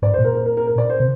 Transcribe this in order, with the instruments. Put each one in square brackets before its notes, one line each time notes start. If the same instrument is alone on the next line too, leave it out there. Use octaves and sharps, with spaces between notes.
[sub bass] G#2 [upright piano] D5
[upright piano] C5
[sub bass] A#2
[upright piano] A#4
A#4
A#4
A#4
A#4
D5
C5
[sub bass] C3